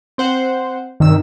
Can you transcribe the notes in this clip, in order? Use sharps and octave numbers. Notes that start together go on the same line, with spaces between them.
C4 C5 F#5
G2 C3 D#3 E6